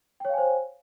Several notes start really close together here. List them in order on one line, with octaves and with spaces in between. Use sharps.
G5 C#5 F5 G#5 C5